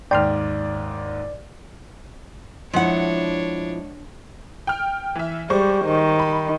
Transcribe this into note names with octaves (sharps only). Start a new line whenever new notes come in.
D#2 G#2 D5 G5 C6 F6
F3 G#3 D4 E4 C#5 F#5
G5 F6
E3 E5
G3 G#3 C5 C#6
D#3
B5